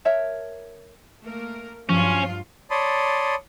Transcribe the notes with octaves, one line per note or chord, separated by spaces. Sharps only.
A#4 C#5 E5 A5
A3 A#3 A#4
G2 F3 F#3 C#4 F4
C#5 D5 A5 B5 C6 D#6